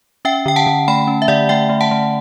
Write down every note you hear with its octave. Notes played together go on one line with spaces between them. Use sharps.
C#4 E5 G5
D3 G5
F#5 A5
D3
A3 G5 B5
C#4
E5
D3 D5 F#5
A3 E5 G5
A3
F#5 A5
A3